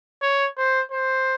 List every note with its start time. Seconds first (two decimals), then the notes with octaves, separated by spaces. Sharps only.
0.22 C#5
0.57 C5
0.91 C5